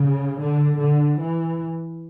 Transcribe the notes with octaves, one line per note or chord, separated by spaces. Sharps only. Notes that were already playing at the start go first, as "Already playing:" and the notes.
Already playing: C#3
D3
D3
E3